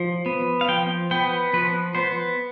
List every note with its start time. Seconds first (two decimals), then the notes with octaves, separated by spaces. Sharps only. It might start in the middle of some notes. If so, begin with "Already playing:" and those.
Already playing: F3
0.26 B3
0.61 F5
0.68 F3 G5
1.11 B3 G5
1.53 F3 B4
1.95 B3 C5